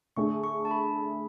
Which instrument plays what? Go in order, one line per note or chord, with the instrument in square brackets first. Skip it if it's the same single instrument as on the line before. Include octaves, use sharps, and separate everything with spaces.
[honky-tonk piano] D3 A3 D4 G#4 [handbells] C#6
[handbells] C#6
A5
B5